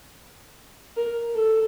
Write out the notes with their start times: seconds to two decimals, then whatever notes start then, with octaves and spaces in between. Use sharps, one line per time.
0.97 A#4
1.35 A4